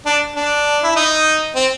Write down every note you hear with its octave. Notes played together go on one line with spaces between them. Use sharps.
D4
D4
E4
D#4
C4